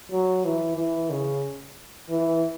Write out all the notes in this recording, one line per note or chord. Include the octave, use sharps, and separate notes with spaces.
F#3
E3
E3
C#3
E3